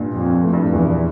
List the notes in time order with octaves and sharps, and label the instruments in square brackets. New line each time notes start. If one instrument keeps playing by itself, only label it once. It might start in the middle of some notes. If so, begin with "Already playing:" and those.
Already playing: [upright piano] G2 A#2
[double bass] F2
[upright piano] A2
G2
A2
[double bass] E2 [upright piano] G2 A#2